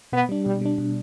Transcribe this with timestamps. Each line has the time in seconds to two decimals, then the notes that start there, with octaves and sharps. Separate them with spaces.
0.13 B2 B3
0.29 G3 D4
0.45 B2 G3
0.61 G3 D4
0.78 B2